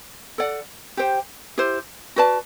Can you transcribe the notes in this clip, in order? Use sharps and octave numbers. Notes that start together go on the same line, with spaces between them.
A4 D5 F#5
G4 C5 G5
E4 G4 C5
F#4 B4 D5 A5